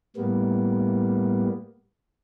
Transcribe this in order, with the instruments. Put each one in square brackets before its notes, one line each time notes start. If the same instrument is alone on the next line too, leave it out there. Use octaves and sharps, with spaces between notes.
[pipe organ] A2 G3 A#3 B3